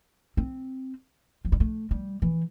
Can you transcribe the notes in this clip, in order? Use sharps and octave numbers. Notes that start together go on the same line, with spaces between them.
C4
F3
G3
A3
G3
E3